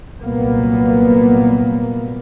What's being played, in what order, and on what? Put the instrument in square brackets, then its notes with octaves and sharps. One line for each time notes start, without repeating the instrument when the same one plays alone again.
[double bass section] C2 A#2 F#3 A#3 B3